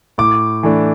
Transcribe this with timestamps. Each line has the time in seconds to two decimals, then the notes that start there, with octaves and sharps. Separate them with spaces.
0.18 A2 D6
0.63 E3 A3 D4